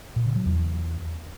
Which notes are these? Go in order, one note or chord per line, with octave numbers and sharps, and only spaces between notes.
A#2
C#3
F#3
E2